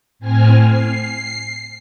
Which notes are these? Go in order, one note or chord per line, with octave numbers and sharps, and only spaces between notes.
A2 C4 G#5 F6
C7